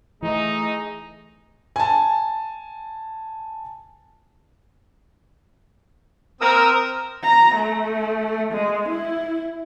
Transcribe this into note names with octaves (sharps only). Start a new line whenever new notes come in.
E3 A3 D#4 G#4 D#5
G#5 A5
C4 A#4 D#6 E6
A#5
A3
G#3
E4